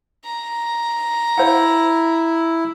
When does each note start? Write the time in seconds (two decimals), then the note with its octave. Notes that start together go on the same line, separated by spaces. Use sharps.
0.24 A#5
1.38 E4 C5 F5 F#5